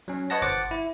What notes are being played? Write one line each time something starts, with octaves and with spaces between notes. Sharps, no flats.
F#3 C#4
B4 C#5 D#5 F#5 A5 A#6
G1 C5 F#5 D6 A6
E4